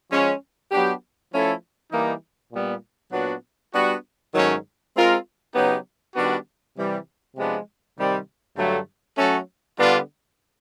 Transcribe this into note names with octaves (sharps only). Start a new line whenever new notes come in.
F3 G#3 C#4
F#3 B3 D4 G4
F3 A3 C#4 E4 A4
E3 G3 A#3 D#4
A#2 G3 B3
A#2 F#3 B3 D4 F#4
G3 B3 D4 F#4
G#2 D#3 F#3 A3 C#4
G#3 C4 F4 A#4
C#3 F#3 B3 D#4 G4
D#3 G3 B3 D4 F#4
C3 E3 G3
C3 F3 G#3 B3 D4
C3 D#3 G3 C4
G2 D3 F#3 A3
F#3 A3 C#4 F#4 A4
D3 G3 B3 D4 F4